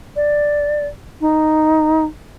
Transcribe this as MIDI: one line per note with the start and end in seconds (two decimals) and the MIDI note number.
0.16 0.87 74
1.21 2.05 63